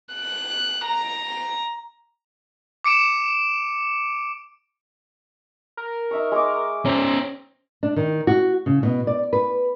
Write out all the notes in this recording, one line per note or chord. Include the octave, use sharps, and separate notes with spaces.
F#6
A#5
D6 C#7 D7 E7
A#4
D#4 E5 C#6
G#3 C#6 D6
C#4 C5 A#5
D4
D#3
F#4
C#3
B2
D5
B4